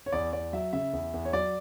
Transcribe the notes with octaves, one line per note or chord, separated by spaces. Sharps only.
C#5
E2 D5
E2 D5
F#3 E5
C#3 E5
E2
E2
C#5
F#3 D5